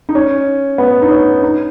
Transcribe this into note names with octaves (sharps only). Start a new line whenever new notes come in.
D#4
C#4
B3
D#4
C#4
D#4